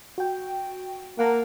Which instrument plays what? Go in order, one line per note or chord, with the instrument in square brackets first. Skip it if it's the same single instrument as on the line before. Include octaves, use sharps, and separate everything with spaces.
[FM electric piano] F#4 G5
[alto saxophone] A#3 [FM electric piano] F#5 A5 A#5